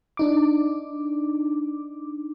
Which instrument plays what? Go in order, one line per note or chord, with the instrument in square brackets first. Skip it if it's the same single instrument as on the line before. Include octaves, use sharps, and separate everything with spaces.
[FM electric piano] D4 D#4 D6